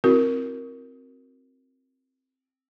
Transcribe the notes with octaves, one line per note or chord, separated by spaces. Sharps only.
C4 E4 F#4 A#4